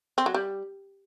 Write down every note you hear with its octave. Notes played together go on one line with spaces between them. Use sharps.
C4
F#3
G3